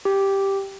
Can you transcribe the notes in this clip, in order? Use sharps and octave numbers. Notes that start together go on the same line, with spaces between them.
G4